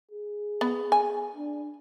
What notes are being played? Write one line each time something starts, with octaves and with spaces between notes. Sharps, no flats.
G#4
B3
G#5
D4